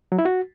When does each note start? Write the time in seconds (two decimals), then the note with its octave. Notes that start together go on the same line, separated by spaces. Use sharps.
0.12 F#3
0.19 E4
0.25 F#4